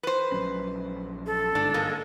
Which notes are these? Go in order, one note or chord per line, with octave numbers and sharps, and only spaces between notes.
B4 C5
A#1 F#3 C#4
A4
G1 G#2 D4
G#3 A#3